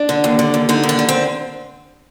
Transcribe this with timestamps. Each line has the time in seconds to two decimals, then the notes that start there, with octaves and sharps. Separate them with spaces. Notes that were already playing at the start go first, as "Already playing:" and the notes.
Already playing: D4
0.09 D3
0.24 D#2
0.39 D3
0.54 D#2
0.69 D3 D#4
0.83 D#2
0.89 D4
0.99 D3
1.09 C4